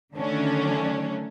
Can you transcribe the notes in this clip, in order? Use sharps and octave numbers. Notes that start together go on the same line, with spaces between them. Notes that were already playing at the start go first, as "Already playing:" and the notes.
D3 D#3 F#3 A3 C#4 D4